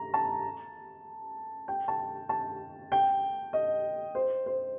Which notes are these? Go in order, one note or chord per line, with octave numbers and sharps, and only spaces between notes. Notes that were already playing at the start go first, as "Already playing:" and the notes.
Already playing: A#5
A5
G5
A5
A5
G5
D#5
C5
C5